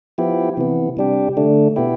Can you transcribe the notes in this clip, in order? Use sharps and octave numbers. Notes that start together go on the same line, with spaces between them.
F3 B3 E4 G4
C3 E3 B3
C3 G3 D4 G4
D3 A3 D4
B2 B3 E4 G4